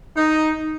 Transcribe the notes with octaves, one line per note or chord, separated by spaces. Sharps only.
D#4